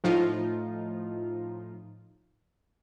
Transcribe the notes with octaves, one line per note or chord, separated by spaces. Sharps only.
A2 F3 D#4 F4